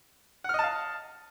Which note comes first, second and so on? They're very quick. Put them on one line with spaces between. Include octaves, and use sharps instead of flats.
F#5 F6 D#5 A5 F5